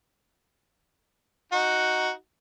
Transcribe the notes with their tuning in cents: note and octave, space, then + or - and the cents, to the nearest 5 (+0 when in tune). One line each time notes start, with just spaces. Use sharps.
D#4 +5 F#4 +0